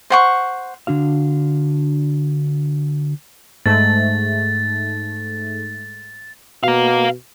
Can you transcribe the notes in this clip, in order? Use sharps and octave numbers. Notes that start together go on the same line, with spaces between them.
C5 F#5 C#6
D3 D4 F#4 F5
G#2 A3 A6
B2 F5 A#5